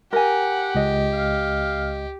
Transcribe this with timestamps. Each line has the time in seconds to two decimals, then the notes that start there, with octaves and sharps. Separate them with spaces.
0.13 G4 A#4 F#5 G#5
0.75 C#2 D#5
1.13 F5